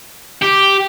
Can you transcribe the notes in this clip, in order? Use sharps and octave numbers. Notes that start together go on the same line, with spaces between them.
G4